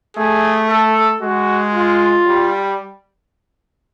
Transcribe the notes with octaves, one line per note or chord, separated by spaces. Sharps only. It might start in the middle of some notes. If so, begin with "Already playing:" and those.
A3 G#4
A4
G#3 F#4
F4
G3